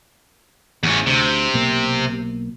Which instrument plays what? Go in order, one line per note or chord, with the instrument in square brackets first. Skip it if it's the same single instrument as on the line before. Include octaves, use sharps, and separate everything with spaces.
[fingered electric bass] A1 [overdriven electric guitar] E2 C#4
[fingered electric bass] D2 [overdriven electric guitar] C3
[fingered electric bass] B1 B2 A#3